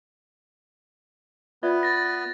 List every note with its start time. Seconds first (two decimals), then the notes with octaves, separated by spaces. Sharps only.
1.63 B3 F4 B4 D5 E5
1.83 A6 A#6